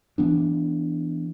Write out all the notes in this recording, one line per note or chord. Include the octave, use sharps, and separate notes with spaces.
E3 B3 D4